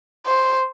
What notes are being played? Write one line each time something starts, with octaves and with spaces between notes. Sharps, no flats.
C5